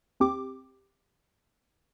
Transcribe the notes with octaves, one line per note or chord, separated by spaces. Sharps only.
D#2 C4 G4 D6